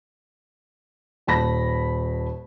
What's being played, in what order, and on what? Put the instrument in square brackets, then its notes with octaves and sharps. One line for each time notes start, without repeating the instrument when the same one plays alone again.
[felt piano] D#1 A5 B5 A#6